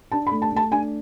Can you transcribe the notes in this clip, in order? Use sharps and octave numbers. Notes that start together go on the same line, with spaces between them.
D4 A5
B5
A3
A5
A3 A5
D4 G#5